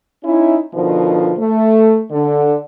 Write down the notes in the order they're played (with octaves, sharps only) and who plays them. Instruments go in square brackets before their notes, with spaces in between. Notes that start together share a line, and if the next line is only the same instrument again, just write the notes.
[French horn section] C#4 D#4 E4
B2 D3 D#3 F3
A3
D3